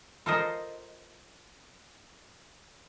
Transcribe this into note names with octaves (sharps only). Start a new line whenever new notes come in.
F4 A4 A#4 C5 D#5